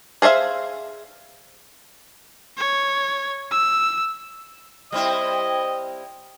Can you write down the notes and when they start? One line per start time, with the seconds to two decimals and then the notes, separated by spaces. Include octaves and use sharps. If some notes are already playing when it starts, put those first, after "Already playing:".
0.22 G#4 C5 C#5 E5 F5
2.57 C#5
3.51 E6
4.92 G3 C4 E4 D#5